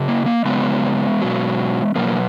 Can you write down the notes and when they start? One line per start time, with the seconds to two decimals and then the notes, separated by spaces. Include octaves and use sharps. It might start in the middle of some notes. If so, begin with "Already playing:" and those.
Already playing: C#3 F#3
0.08 A#3
0.26 A#3
0.45 C#3 F#3 G#3 B3
1.21 B2 F#3
1.95 B2 F#3 A#3